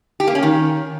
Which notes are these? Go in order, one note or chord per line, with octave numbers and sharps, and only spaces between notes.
G4
A#3
C#4
D#3